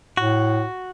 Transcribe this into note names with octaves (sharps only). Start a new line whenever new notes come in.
A2 F#4